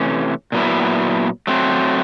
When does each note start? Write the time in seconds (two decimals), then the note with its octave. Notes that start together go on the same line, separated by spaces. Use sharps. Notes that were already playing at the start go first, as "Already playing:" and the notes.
Already playing: C3 E3 A3 C#4
0.52 A#2 F#3 B3 E4
1.47 F#3 A3 C4